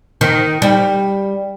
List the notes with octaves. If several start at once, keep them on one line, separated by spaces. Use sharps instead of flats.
D#3
G3